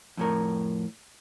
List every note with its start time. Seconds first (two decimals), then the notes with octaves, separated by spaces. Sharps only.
0.17 F2 A2 A#4